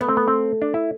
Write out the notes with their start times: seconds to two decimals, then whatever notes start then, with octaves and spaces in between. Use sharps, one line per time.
0.01 A3 B3
0.09 C4
0.17 B3
0.28 C4
0.62 D4
0.74 E4